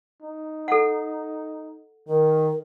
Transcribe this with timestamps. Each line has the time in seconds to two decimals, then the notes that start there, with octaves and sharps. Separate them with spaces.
0.23 D#4
0.68 A4 F#5
2.08 D#3 A#4